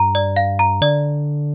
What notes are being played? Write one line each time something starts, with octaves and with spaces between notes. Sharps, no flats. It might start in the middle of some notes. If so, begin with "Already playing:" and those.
Already playing: G2 A#5
D5
F5
A#5
D3 D5